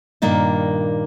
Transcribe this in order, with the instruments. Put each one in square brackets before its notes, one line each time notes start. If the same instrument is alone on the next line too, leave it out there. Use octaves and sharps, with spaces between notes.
[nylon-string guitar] G2 A#2 D#3 A#3 D#4 D5